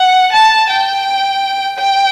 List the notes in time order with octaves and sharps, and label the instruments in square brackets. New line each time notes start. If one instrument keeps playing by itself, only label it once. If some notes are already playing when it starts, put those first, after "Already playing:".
Already playing: [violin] F#5
A5
G5
G5